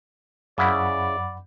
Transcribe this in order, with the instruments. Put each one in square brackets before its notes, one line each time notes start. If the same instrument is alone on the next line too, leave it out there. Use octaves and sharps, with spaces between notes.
[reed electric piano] F#2 F#5 B5 [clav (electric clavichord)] C#3 E4 [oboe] D5